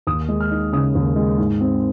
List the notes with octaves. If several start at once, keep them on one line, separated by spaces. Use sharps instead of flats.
D#2 D#6
G#3
F6
D#4
C#3 D#6
D#2
G#3
G#2
C4